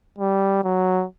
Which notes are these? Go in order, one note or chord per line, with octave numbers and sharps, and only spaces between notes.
G3
F#3